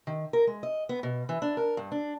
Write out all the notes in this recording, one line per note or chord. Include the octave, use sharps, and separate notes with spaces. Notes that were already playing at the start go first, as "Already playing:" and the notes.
D#3
A#4
G#3
D#5
B3
B2
E3
D4
A#4
G2
D4